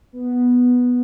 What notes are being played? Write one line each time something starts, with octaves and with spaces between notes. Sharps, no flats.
B3